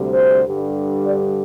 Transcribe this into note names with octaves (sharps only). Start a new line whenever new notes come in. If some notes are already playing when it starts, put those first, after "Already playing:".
Already playing: D2 C3 G3
C5
G2 D3 G3
D5